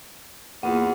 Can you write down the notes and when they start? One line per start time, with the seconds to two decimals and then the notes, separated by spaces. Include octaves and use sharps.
0.63 E2 A#3 F4 F#5